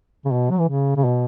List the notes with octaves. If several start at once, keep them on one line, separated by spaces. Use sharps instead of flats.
C#3
B2
F#3
E3
C#3
C#3
B2